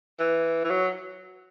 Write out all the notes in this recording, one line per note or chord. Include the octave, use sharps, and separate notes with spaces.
E3
E3
F#3